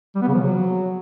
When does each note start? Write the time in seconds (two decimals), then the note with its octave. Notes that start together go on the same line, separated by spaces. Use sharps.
0.15 G3
0.22 B3
0.28 C#3
0.34 F3
0.41 F#3